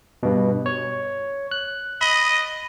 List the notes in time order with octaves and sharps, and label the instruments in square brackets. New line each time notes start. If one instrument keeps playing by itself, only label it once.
[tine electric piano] G2 B2
C#5
F#6
[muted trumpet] D#5 [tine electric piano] B5